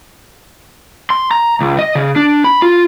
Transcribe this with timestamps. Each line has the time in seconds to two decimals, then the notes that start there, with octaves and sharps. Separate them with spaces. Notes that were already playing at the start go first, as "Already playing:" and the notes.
1.10 C6
1.31 A#5
1.61 C#2
1.79 D#5
1.95 C#3
2.16 D4
2.44 B5
2.62 F4